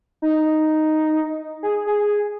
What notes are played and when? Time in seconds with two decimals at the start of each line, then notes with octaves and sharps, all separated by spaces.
0.22 D#4
1.63 G#4
1.86 G#4